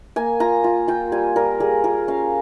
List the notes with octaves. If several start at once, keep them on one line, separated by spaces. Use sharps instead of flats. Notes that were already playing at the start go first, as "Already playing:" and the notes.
A#3 G#5
F4 A#5
F4
F4 G5
G3 G#5
G3 A#4
G3 G#4
F4 A#4
C#4 F5